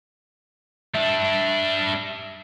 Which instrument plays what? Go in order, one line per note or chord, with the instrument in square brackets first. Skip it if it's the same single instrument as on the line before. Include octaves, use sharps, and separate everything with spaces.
[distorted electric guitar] G3 D4 [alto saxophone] E5